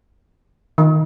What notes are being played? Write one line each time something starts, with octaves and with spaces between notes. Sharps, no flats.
D#3